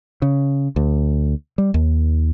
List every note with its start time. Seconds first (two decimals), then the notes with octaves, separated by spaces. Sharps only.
0.22 C#3
0.76 D2
1.58 G3
1.74 D#2